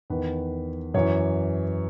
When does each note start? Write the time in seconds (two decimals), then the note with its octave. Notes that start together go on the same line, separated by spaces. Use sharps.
0.10 E2 D#3 B4
0.94 F#2 E3 C#5